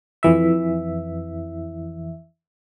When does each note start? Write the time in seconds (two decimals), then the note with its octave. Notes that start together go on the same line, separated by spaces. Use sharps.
0.23 F2 E3 E5